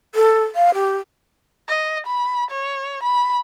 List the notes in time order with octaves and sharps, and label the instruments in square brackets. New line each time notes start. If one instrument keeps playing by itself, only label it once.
[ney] A4
F5
G4
[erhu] D#5
B5
C#5
B5